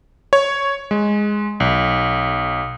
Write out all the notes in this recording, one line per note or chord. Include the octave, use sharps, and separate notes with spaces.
C#5
G#3
B1